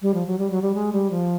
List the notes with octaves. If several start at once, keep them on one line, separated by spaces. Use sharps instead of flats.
G3
F3
F#3
G3
F#3
G3
G#3
G3
F3